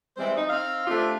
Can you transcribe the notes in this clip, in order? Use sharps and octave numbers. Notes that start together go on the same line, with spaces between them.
E3 G3 G#3 C4 C5
D#4
C4 D#4 F5
A3 C4 D4 F4 G4